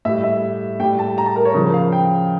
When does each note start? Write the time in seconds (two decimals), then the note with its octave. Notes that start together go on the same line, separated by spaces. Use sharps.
0.05 A2 G3 E5
0.24 E5
0.80 A2 G5
0.83 G3
0.99 A5
1.18 A#5
1.26 A5
1.36 A#4
1.45 C#5
1.54 C#3 F3
1.74 F5
1.92 G5